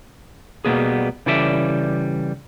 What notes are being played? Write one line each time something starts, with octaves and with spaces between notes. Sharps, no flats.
B2 G3 G#3 A#3 B3 G#4
C#3 E3 G3 A4 D5 E5